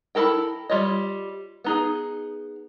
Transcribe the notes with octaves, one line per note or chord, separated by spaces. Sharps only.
E4 F4 A4 A#4 G5
G3 F4 C#5 D#5
B3 D#4 G#4